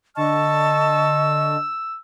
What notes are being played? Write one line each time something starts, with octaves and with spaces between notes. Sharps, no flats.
D3 D#5 A5 C#6 E6